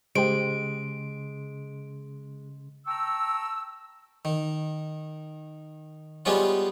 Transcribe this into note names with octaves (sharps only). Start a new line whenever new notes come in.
C#3 G#3 G4 C5 C6 D7
G5 A5 A#5 C#6 E6
D#3
G3 G#3 B3 C#4 F4